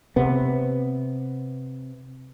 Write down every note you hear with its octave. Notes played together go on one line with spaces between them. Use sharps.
C3 B3